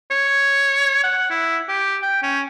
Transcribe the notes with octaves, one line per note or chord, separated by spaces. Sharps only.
C#5
F#5
E4
G4
G5
C#4